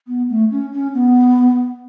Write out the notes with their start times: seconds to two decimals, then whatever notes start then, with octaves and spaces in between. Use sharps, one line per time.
0.07 B3
0.29 A3
0.51 C#4
0.72 C#4
0.93 B3